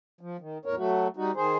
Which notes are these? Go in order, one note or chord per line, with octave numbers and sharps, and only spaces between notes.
F3
D#3
E2 A2 A#4 C#5
F#3 A3 F#4
G3 D#4 F#4
D#3 G#4 C5